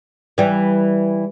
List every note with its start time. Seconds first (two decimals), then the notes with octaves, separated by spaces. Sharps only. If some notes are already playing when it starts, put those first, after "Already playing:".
0.38 E3 G3